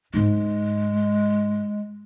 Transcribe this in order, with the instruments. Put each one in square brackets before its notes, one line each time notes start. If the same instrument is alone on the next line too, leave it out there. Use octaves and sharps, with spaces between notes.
[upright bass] G#2 D#4 [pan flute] G#3